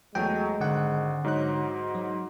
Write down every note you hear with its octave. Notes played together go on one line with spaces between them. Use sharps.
E2 F#3 G#3 A3 F#4 G5
G#1 D3 F#5 F#6
G#2 F#3 D#4 F#6
F#4
F#3